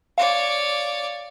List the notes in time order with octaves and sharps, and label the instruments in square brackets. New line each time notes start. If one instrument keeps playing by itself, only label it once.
[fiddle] C#5 D5 [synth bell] F5